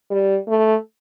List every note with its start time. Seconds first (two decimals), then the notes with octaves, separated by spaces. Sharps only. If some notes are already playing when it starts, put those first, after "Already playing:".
0.11 G3
0.49 A3